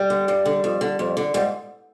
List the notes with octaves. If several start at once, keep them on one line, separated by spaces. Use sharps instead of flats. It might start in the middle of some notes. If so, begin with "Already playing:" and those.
Already playing: G3
D3
G2
D3
F2
D3
F2
D3
G#2 G3